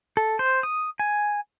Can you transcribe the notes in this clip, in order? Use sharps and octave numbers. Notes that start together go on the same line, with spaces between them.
A4
C5
D#6
G#5